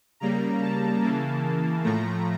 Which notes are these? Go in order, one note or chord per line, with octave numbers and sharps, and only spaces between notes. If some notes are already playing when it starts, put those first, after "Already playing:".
C#3 G3 A#3 A#5
A5
C#3 E3 A#3
A2 F3 A3 A#5